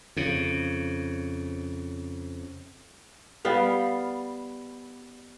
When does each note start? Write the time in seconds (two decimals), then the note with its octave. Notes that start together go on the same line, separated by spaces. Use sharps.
0.17 F2 C#3
3.45 G3 B3 F5